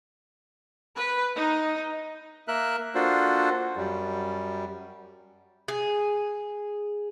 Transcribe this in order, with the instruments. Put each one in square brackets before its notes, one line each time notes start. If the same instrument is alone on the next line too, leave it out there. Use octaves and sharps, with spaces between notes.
[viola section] B4
D#4
[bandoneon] A#3 A#4 E5 F#6
A#3 D4 F4 F#4 A4 C5
F#2 G3
[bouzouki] G#4